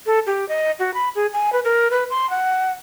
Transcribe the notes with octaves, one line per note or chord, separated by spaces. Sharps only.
A4
G4
D#5
F#4
B5
G#4
G#5
B4
A#4
B4
C6
F#5